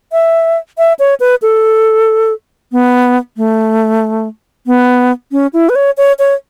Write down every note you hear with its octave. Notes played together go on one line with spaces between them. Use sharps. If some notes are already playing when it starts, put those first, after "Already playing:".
E5
E5
C#5
B4
A4
B3
A3
B3
C#4
E4
B4
C#5
C#5
C#5